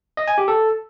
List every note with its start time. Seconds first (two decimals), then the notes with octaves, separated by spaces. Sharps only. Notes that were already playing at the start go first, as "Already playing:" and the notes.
0.17 D#5
0.28 G#5
0.38 G4
0.48 A4